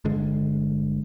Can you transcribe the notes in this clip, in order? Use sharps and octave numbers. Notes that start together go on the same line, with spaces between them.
G1 D3 G#3